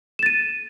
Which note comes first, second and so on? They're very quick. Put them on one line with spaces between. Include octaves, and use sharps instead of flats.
E7 A6 D#7